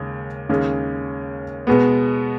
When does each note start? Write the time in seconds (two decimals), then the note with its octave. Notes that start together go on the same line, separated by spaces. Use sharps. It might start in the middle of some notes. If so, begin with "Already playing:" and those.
Already playing: D#2 C#3 G#3 C#4
0.49 D#2 C#3 G#3 C#4
1.67 B2 G#3 B3